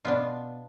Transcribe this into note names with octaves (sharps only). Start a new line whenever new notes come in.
B2 B3 D4 F4